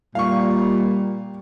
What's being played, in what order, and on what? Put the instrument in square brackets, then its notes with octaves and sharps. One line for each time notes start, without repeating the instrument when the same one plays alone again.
[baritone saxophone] A#2 [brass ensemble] G3 [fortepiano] F5 C#6